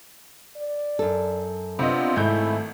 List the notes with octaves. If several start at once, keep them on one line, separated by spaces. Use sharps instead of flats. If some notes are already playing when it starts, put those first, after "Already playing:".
D5
F#2 A4
C3 B3 D4 F4 D#5
G#1 G#2 A3 E4 G6